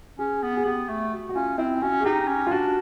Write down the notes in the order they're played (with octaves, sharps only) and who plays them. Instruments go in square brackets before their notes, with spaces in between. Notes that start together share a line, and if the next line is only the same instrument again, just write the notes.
[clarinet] C#4 [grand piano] G#4
[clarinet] B3
[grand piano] G#4
[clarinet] B3 [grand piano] G4
[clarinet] A3
[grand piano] F#4
F#4
[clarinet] C#4 [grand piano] F4
[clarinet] C4 [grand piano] E4
[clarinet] C#4 [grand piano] F#4
[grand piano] G#4
[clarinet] D#4 [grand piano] G4
[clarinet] C#4
[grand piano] F4
[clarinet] D4 [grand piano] F#4